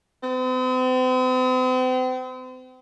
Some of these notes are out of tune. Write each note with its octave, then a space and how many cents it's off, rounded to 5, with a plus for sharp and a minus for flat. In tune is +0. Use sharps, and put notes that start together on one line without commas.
C4 -40